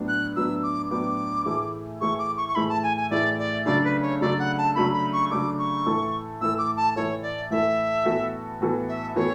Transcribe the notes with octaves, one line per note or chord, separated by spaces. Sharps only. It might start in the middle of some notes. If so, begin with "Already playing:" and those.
Already playing: A2 F#3 B3 D4
F#6
A2 F#3 B3 D4 E6
D6
A2 F#3 B3 D4 D6
A2 E3 A3 E4 G#4
A2 E3 A3 E4 G#4 C#6
D6
C#6
C#6
A2 E3 A3 E4 G#4 B5
A5
G#5
G#5
A2 E3 A3 E4 G#4 D5
D5
C#3 F#3 A3 D4 D5
B4
C#5
C#3 F#3 A3 D4 D5
F#5
A5
C#3 F#3 A3 D4 B5
B5
C#6
C#3 F#3 A3 D4 D6
C#6
A2 E3 A3 E4 A4
A2 E3 A3 E4 A4 E6
D6
A5
A2 E3 A3 E4 A4 C#5
D5
A2 E3 A3 E4 A4 E5
A2 E3 B3 F#4 A4
A2 E3 B3 F#4 A4
E5
A2 E3 B3 F#4 A4 C#5